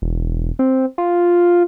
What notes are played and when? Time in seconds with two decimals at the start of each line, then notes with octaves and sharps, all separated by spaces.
0.02 E1
0.59 C4
0.98 F4